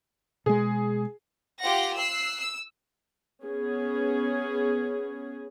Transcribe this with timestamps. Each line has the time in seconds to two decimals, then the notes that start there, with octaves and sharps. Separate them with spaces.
0.46 B2 G#3 G#4
1.61 F4 G4 F#5 A#6
1.95 E6 F#6 C7
2.40 E6
3.44 B3 C#4 G#4